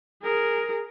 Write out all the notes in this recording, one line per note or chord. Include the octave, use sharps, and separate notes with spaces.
G#4 A#4